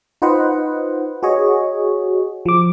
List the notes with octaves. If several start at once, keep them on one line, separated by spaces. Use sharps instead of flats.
D#4 F4 B4 C5 D#5 F#5
F#4 G#4 C#5 D#5
F3 D6